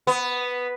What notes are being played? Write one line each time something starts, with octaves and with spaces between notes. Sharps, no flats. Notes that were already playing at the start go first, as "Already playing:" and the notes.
B3